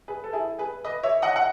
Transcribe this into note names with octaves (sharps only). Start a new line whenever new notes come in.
G#4 B4
A4
E4 G#4
G#4 B4
B4 D#5
C#5 E5
D#5 F#5
F#5